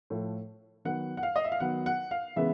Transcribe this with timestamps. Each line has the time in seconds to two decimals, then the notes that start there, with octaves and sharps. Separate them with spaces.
0.10 A2 F3 A3
0.85 D#3 F#3 B3 F#5
1.17 F#5
1.23 F5
1.36 D#5
1.44 E5
1.52 F5
1.60 D#3 F#3 B3 F#5
1.86 F#5
2.11 F5
2.36 C#3 E3 G#3 B3 E5